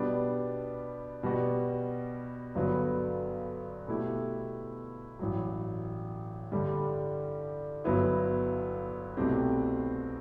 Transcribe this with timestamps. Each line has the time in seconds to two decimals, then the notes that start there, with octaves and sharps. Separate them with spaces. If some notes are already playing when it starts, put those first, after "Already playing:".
Already playing: B2 G3 B3 D4
1.23 B2 G3 B3 F#4
2.55 G1 G2 D3 F#3 B3
3.88 B2 A3 E4 G4
5.19 A1 G2 F#3
6.52 G2 D3 G3
7.84 G1 G2 F#3 B3 E4
9.17 C2 B2 A3 C4 G4